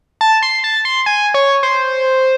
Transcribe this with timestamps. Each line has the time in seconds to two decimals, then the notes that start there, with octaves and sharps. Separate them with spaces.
0.21 A5
0.43 C6
0.64 A5
0.85 C6
1.06 G#5
1.34 C#5
1.63 C5